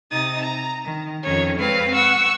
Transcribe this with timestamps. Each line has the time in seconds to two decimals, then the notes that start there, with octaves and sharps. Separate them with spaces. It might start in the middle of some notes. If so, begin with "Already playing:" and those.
0.11 C3 D#4 D#6 A6
0.41 A#5
0.84 D#3
1.23 F2 D#3 C#4 C#5
1.57 G#3 C4 B4 F5
1.94 F#5 C#6 E6